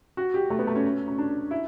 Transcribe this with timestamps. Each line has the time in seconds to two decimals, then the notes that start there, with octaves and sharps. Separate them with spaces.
0.17 F#4
0.34 G4
0.50 A3
0.59 B3
0.67 A3
0.75 C#4
1.08 C#4
1.18 D4
1.51 E4